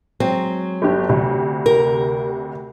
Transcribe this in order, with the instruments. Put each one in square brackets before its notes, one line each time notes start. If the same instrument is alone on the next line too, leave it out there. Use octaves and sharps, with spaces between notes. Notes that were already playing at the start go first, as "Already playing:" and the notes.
[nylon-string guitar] F#3 G#3 C4
[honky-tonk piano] G1 D4 G4
D2 C3
[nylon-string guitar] A#4